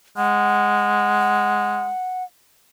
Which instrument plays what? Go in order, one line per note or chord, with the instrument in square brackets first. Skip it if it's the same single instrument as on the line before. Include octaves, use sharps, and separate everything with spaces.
[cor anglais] G#3 [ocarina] F#5